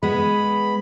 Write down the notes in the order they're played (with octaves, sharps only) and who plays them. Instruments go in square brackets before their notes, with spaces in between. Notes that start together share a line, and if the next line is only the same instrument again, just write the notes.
[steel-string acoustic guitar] G#3 B3 [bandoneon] B5